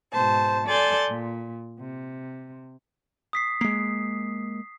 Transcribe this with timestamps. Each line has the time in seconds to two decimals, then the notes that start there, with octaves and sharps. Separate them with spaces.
0.12 G#2 B2 C5 A5
0.67 A4 D5 G#5 C6 G6 A6
1.08 A#2
1.78 C3
3.33 D#6 B6 C7
3.61 G#3 A#3 C7